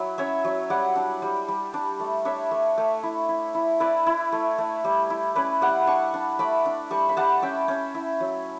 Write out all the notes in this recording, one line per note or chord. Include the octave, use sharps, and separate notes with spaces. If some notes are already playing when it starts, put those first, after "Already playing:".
Already playing: F#3 E4
C#4 C#5 E5
F#3
G3 D5 F#5
D4
G3
G3
D4
A3
D4 C#5 E5
A3
A3
E4
E4
E4
E4 B4 D5
E4
A3
A3
G3
E4
C#4 B4 D5
G3 D5 F#5
D4 A5 C#6
D4
A3 B5 D6
D4
G3 A5 C#6
B5
G3 F#5 A5
C#4 E5 G5
C#4
E4
F#3